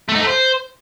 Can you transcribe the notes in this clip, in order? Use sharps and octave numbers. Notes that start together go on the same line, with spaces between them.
A3
D#4
A3
C5